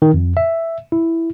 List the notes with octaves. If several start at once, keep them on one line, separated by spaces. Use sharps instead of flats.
D#3
F2
E5
E4